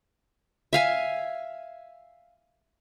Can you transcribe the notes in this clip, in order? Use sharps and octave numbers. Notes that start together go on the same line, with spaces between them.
E5 F5 G#5